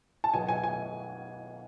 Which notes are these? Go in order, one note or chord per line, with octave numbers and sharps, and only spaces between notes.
A5
B1 B2 F#3 B3 G#5
G#5
G#5